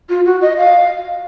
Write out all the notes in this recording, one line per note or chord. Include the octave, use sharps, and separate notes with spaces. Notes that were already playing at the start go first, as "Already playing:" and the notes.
F4
F#4
D#5
F5